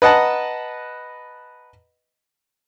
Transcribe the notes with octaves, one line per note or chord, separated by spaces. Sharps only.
B4 D#5 F#5 A5 A#5